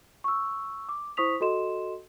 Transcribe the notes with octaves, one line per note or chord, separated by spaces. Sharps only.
C#6 E6
D6
E4 C5 C#6 D#6 B6 F7
F#4 A4 D#5 C6 E7